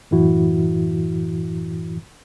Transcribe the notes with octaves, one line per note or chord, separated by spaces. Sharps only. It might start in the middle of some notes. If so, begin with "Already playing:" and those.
F#2 A2 E3 E4 F#4